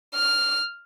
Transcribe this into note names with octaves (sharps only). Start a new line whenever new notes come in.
F6